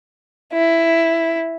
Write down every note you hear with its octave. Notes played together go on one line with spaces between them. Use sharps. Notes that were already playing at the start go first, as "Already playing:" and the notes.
E4